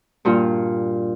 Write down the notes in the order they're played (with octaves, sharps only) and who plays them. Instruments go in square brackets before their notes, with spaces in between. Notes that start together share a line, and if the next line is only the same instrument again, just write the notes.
[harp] G2 A#2 F4